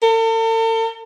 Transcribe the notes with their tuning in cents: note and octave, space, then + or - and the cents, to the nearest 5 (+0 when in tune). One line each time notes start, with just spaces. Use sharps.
A4 +45